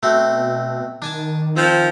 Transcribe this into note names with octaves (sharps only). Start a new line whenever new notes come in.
B2 A3 C4 F#4
D#3 D4 G#5 A5
F3 C4